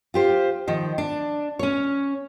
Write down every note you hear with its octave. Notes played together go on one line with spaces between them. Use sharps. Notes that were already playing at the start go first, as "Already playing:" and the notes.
F4 G4 C5
D#3 F3
D4
C#4 C#5